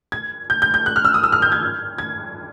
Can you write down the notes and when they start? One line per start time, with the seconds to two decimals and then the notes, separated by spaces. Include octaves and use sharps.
0.12 G#6
0.50 G6
0.62 G6
0.74 G6
0.86 F#6
0.96 F6
1.05 E6
1.14 D#6
1.24 E6
1.32 F6
1.42 G6
1.52 G#6
1.98 G#6